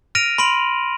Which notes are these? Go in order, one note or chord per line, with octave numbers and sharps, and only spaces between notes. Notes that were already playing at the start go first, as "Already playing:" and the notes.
F6 A#6 D7 D#7 F7
B5 C6 D7 F#7